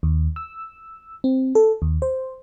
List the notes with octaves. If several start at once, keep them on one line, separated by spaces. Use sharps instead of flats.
D#2
E6
C4
A4
D#2
C5